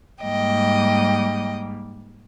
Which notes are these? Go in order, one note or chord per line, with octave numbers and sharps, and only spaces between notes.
G#2 G3 A#3 D#5 G5